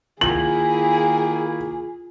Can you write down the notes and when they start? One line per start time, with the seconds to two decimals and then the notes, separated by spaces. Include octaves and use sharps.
0.21 D#3 A#3 E4 F4 G#4 F#7